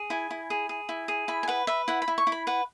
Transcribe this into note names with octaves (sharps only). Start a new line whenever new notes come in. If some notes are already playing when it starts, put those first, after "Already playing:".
Already playing: G#4
E4 G#5
E4
G#4
G#4
E4
G#4
E4 B5
G#5
B4 F#5
B4 E5
E4 F#5
B5
E4
C#6
E4
B5
B4 F#5